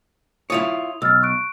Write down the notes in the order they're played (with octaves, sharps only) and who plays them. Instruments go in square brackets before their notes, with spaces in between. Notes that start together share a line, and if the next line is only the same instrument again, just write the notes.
[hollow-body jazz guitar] E4 F4 C#5 [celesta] D#6 F7
[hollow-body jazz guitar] B1 [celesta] E6 F6 A6
[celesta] C#6 F#6 D7